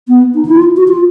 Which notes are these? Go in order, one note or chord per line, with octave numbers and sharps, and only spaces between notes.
B3
D#4
E4
F4
F#4
F4